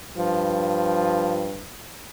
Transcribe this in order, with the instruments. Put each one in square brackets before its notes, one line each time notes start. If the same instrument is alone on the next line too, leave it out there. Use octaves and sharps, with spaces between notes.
[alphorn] G2 [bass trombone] F3